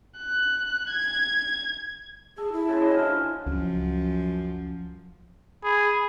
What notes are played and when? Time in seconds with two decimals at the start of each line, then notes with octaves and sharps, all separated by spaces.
0.17 F#6
0.89 G#6
2.38 G#4 A4
2.53 E4
2.69 C#3 A5 C6
2.82 F#4 C5 D#5
2.94 D3 C#4 F4
3.46 C#2 F#2 F3
5.64 G#4 B5